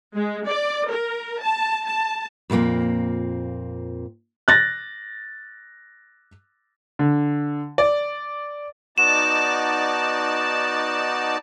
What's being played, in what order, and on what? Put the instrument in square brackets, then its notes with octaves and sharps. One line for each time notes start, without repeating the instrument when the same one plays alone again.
[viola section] G#3
D5
A#4
A5
A5
[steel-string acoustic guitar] F2 A#2 G#3 A#3 C4
[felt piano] F#6 A6 A#6
[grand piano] D3
D5
[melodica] B3 F#4 [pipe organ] D#4 D5 A5 [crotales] E7